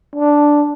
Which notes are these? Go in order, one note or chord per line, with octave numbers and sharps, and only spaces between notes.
D4